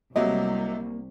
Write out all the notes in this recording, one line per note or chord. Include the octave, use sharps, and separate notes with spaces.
C2 C3 F#3 A3 A#3 D#5